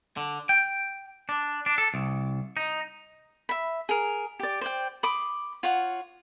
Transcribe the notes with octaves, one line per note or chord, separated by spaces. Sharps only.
D3
G5
D4
D4
A4
C2
D#4
E5 B5
G#4 A#4
G4 D5
C5 D5 G5
B5 C6 D6 D#6
F4 C#5 F#5